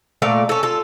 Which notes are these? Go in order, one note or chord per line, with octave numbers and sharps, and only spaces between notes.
A#2 A3 D5 F5
C#4 A4
F4 A4